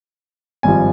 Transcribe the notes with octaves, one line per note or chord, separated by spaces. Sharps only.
G#1 G2 F3 G#5